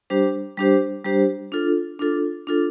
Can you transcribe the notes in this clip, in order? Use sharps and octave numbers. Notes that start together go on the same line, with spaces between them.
G3 D4 G4 C5
G3 D4 G4 C5
G3 D4 G4 C5
D4 F4 A4
D4 F4 A4
D4 F4 A4